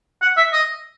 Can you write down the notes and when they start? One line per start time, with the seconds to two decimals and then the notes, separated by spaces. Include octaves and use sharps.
0.22 F#5
0.37 E5
0.53 D#5